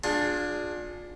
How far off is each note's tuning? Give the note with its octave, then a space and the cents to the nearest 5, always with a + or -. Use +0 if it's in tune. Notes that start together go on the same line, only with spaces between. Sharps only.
D4 +5 F4 +35 G#4 +0